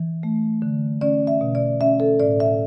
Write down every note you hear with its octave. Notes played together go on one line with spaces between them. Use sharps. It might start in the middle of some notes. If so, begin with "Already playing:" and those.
Already playing: E3
A3
D3
C#4 D5
E5
B2
D5
C#4 E5
A4
A2 D5
E5